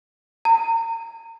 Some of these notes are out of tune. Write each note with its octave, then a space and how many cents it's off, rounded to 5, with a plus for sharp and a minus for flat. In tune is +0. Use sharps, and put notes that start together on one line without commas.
A#5 -35